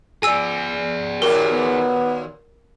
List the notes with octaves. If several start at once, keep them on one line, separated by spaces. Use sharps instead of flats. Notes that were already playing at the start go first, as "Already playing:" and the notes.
G#4 D5 G#5 E6
D#2 A#2 F#4 G4 A#4
B3